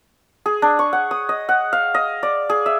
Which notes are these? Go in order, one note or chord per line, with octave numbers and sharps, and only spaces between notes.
G#4
D4
C#6
F#5
D#6
D#5
F#5
F5
D#5
D5
G#4
E5